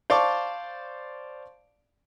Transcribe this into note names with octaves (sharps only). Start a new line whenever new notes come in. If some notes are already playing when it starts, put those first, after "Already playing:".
C5 D5 F5 A5 C#6 D6